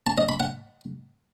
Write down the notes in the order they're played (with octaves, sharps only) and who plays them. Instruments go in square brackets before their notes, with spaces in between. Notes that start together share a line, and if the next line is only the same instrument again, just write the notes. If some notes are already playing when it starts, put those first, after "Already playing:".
[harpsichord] A5
D#5
B5
F#5